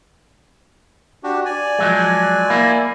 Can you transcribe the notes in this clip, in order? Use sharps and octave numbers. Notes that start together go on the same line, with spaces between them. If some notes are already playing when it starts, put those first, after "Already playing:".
D4 F#4 G4
D5 G#5
F3 F#3 G#3
A#3 E4